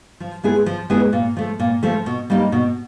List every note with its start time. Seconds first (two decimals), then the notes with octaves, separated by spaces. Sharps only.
0.20 F3
0.43 G#3 B3 E4 G#4
0.66 F3
0.90 G#3 B3 E4 G#4
1.13 A#2
1.37 F3 A3
1.60 A#2
1.83 F3 A3
2.06 B2
2.30 G3 A#3 D#4
2.52 B2